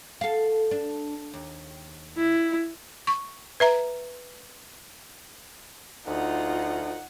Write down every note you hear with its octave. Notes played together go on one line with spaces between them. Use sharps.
A4 F5
D4
D#2
E4
C#6
B4 E5 A#5
D2 D#4 F4 F#5